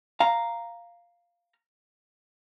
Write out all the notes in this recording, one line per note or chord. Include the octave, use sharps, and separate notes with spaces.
F5 A#5